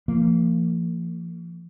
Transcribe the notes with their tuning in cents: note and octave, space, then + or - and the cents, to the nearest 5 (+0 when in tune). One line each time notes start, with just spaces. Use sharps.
F3 -40 A#3 -30